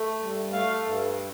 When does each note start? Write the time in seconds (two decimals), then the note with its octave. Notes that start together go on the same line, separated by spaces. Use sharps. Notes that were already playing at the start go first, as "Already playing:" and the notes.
Already playing: A3
0.19 G2
0.53 A3 F5
0.86 G2